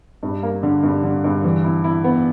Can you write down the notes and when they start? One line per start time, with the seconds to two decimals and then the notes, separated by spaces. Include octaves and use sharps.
0.23 G2
0.43 A#3
0.63 D3
0.83 G2
1.04 D3
1.24 G2
1.44 E3
1.64 E4
1.84 E4
2.04 B3